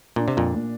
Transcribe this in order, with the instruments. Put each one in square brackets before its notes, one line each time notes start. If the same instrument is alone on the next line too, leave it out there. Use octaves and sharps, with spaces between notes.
[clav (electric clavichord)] A#2 [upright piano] D4
[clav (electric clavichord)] C3
F2 A#2
[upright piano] A#2